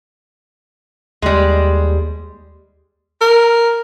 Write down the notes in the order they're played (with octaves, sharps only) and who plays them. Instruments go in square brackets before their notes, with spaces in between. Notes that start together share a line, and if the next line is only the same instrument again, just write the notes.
[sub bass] D#2 [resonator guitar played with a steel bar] G3 G#3
[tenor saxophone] A#4